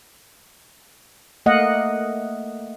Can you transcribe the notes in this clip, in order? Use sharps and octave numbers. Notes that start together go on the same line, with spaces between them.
A3 A#3 D#5 F5 F#5